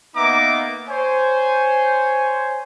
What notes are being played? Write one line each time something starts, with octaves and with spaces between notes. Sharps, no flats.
A#3 B3 D#4 E5 A#5 D6
C5 C#5 G#5